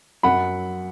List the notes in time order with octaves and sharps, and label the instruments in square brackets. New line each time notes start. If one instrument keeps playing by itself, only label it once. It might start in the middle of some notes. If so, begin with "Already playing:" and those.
[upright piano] F#2 F#3 F#5 B5